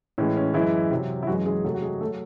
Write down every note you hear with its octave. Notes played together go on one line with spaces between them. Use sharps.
A2 E3 G#3 C#4
C#4
F#2 E3 G#3 E4
C3 F#3
E4
F#2 E3 F#3 G#3 F#4
G#3 G#4
E2 C3 F#3 A3 A4
F#4
G#3 G#4
A3 A4
F#3